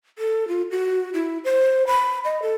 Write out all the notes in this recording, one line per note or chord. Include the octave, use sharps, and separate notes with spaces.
A4
F4
F#4
E4
C5
B5
D#5
A4